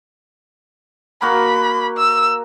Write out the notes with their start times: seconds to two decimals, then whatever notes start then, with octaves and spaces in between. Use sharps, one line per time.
1.22 A#3 F#4 A#4 B5
1.98 E6